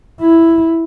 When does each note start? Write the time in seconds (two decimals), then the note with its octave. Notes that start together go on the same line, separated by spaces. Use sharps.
0.21 E4